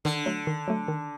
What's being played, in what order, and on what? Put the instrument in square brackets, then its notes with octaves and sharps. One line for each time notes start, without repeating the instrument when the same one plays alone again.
[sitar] D3 [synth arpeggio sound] D#3
[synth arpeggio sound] F#3 A3
D#3
F#3 A3
D#3